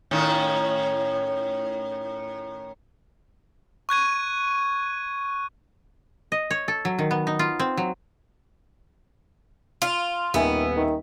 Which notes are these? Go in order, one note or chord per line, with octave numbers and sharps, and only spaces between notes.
A2 D#3 C#4
C#6 F#6 G#6 D#7
D#5
C#5
A4
F#3
D#3
B3
D#4
F4
C4
F#3
F4
D#1 D#3 B3 E5 G#5
D#3